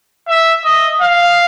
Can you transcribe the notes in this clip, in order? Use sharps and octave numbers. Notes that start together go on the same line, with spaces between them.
E5
D#5
F5